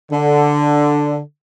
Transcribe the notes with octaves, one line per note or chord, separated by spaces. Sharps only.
D3